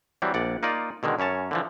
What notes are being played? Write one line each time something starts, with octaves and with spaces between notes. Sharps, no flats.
E3 F#3 G3 C4
A#1 D5 F#5
A#3 D#4 F4 D5
B2 D3 D#3 G#3
F#2 C#4 C#5 A5
D3 E3 F3